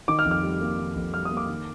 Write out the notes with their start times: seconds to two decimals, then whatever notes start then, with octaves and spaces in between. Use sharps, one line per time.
0.08 D#3 D6
0.19 F6
0.25 F2
0.31 F6
0.43 G3
0.61 A#3
0.78 D#3
0.96 F2
1.14 G3 F6
1.25 D#6
1.31 A#3
1.37 D6
1.48 D#3